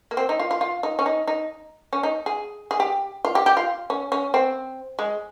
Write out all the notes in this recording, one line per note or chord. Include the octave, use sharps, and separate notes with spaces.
A#3
C4
D#4
F4
F4
F4
D#4
C#4
D#4
D#4
C#4
D#4
G#4
G#4
G4
F4
G4
G4
F4
C#4
C#4
C4
G#3